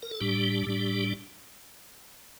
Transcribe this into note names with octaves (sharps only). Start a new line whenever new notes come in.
A#4
A4
A2 G3 D4 G4
A2 G3 D4